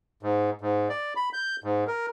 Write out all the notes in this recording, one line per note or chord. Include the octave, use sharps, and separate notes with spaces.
G#2
G#2
D5
B5
G6
G#2
A#4